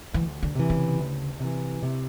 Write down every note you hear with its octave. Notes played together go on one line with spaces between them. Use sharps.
D2 E3
D3
C3 E3
C#3
D2
C3 E3
C3